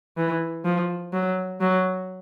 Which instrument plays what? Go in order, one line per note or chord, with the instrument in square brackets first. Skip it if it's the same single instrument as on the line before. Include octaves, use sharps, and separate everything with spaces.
[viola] E3
F3
F#3
F#3